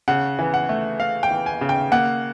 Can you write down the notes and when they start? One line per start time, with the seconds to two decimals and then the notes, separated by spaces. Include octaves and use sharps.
0.08 C#3 F#5
0.39 E3
0.54 F#5
0.69 A3
1.00 A3 F5
1.23 G5
1.30 E3
1.46 G#5
1.61 C#3
1.69 G5
1.92 A#3 F#5